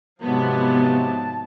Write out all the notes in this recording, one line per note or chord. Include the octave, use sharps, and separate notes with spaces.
G#2 C3 F3 F#3 B3 A5